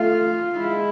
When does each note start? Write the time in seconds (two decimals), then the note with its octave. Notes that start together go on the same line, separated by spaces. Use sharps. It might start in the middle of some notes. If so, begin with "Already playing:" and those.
Already playing: A3 F4
0.58 G#3 E4